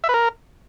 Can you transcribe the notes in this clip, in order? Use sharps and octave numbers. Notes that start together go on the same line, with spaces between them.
E5
B4
A#4